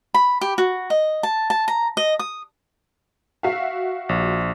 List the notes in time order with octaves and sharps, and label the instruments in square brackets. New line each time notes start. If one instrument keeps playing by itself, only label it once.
[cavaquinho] B5
G4
F#4
D#5
A5
A5
A#5
D#5
D#6
[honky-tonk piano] F#4 E5 F5
[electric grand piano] A#1